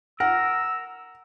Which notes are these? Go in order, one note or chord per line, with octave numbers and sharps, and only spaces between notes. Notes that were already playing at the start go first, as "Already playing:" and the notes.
A#4 F#5 E6